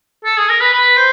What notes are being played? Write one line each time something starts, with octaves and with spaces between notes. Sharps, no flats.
A4
G#4
A#4
B4
B4
C5